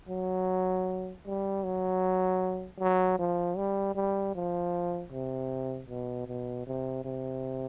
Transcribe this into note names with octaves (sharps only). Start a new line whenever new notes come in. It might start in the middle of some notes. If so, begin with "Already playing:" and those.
F#3
G3
F#3
F#3
F3
G3
G3
F3
C3
B2
B2
C3
C3